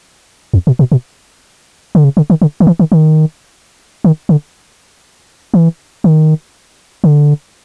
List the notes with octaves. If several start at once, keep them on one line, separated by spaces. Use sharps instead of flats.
F2
B2
B2
B2
D3
C#3
D3
D#3
D3
D#3
E3
D#3
D#3
D#3
D3
E3
D#3
D3